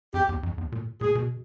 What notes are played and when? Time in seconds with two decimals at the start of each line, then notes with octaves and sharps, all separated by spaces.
0.14 F2 G4
0.29 E2
0.43 F2
0.58 E2
0.72 A#2
1.01 A#2 G#4
1.15 B2